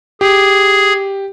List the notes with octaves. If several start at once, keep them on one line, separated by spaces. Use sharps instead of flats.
G4 G#4